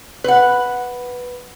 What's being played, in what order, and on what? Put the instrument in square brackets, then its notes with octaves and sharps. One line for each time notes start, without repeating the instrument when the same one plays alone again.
[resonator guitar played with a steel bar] B4 F#5